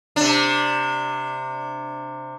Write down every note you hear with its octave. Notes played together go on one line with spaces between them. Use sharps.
C3 D4